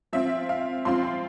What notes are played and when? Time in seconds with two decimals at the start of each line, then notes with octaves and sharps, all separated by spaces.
0.13 F3 C4 F4 E5
0.49 F5
0.85 F3 C4 F4 C6
1.03 C6